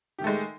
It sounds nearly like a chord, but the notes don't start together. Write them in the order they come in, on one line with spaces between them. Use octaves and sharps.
G4 D#3 A3 G#3